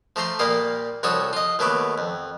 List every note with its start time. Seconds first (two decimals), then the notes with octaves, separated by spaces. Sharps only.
0.16 F3 A3 A#5 C6
0.39 A#2 G3 A#3 F5 D#6
1.03 C2 F3 F#4 A4 C#5 D#6
1.33 F4 D#5
1.59 D#2 F#3 A3 B3 D6
1.98 F2